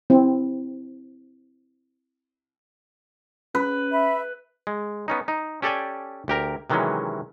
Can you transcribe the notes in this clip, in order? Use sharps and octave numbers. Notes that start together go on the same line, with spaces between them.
C4 E4
C#4 B4
E5 B5
G#3
B3 C#4 D#4
D#4
C#4 G4 A4 D5 G5 G#5
D2 G4 A#4 A#5
C3 D#3 E3 F#3 G#3 C#4